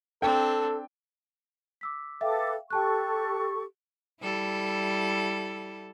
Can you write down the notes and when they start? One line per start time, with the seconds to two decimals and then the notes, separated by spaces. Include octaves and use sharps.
0.22 C4 D4 A4 G5
1.81 D6 E6 B6
2.21 A4 B4 E5 F5 G5 D6
2.70 G4 A4 G5 A5 C#6 F#6
4.22 G3 E4 A4